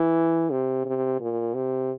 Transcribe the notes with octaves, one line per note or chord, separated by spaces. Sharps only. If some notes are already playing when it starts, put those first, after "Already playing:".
Already playing: E3
C3
C3
A#2
C3